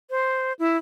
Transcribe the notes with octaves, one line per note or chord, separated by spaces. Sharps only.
C5
E4